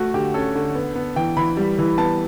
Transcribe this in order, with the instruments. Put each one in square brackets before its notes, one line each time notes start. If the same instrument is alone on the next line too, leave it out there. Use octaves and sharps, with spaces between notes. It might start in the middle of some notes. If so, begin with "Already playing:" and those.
Already playing: [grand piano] A3 F#4
D3 G4
C#4 A4
D3
B3
B3
E3 G5
E3 B5
G3
E3
B3 A5